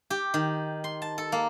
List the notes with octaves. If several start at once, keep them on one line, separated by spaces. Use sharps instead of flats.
G4
D#3
C6
A5
A4
A#3